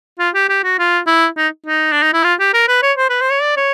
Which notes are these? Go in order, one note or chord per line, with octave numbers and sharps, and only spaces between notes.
F4
G4
G4
F#4
F4
E4
D#4
D#4
D4
D#4
E4
F4
G4
A#4
B4
C#5
C5
B4
C5
C#5
D5
C#5